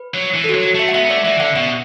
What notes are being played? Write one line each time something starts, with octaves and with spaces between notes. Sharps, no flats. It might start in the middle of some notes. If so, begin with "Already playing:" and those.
Already playing: B4
F#3
E3
A4
F#4
F#3
F#4
A3 E5
F#5
B3 E5
B3
A3 D5
E3 E5
D3 F#5
B2 F#5